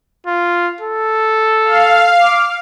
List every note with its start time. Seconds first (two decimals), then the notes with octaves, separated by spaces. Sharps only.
0.27 F4
0.81 A4
1.64 F5
2.22 D6